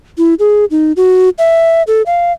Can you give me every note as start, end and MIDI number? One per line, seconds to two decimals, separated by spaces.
0.18 0.34 64
0.39 0.65 68
0.71 0.92 63
0.97 1.29 66
1.38 1.82 76
1.87 2.02 69
2.06 2.32 77